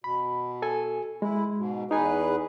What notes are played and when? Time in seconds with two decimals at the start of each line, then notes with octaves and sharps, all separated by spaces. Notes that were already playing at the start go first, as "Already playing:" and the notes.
0.04 B2 B5
0.62 A4 G#5
1.22 G#3 E4
1.57 G#2 B2
1.91 E2 D#4 G#4 B4 G#5